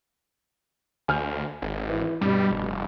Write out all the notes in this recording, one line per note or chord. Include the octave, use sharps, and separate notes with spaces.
D2 G#5 F6 G6
G#1
E3
G2 B2 G3
F1